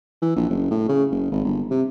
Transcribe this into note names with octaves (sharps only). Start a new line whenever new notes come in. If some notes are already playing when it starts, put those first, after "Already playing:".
E3
A#1
F#1
A2
C#3
F#1
G#1
G1
C3